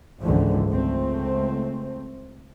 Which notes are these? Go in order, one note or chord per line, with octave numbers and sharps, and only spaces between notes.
F#1 C#2 G#2 D3 E3 F3
C#2 A3 C4